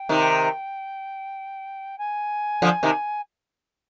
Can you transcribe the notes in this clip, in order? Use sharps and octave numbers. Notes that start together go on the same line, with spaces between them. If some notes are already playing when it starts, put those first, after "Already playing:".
Already playing: G5
C3 D#3
G#5
D3 F3
C3 D#3